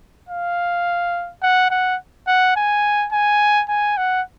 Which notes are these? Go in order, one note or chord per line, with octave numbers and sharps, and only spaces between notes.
F5
F#5
F#5
F#5
G#5
G#5
G#5
F#5